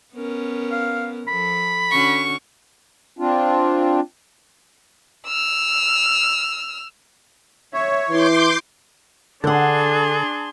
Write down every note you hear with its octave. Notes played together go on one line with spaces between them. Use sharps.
B3 C#4 A#4
F5
F3 A4 B5
D3 C#4 F#4 C#6
C4 D4 F4
E6 F6
C#5 E5
E3 E4 C6 D6 G6
D3 D4 G#4 A4 F#5 A5 C6